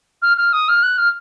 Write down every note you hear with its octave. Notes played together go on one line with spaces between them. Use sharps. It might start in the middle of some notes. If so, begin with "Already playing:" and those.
F6
F6
D#6
F6
F#6
F6